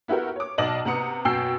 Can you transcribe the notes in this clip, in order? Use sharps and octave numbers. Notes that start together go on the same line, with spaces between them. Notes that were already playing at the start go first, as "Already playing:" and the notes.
B3 E4 F#4 G4 A#4
C#5 D6
B1 D5 D#5 A5 D6 F#7
C3 B3 F#5 A#5 D#6 C#7
F#2 B2 G5 E6 G6 C7